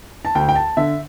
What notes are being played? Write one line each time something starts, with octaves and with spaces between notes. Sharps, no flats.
A5
D2 G5
G5
A5
D3 E5